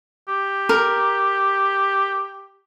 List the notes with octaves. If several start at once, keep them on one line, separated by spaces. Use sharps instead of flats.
G4
A#4